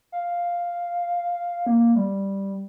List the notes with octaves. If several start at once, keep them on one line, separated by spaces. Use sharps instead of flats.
F5
A#3
G3